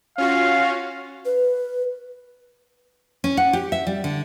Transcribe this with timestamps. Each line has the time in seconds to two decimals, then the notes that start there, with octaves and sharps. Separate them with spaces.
0.18 C#4 F4 F#4 F5
1.25 B4
3.24 C#4
3.37 F#5
3.53 G4
3.72 E5
3.87 G3
4.04 D3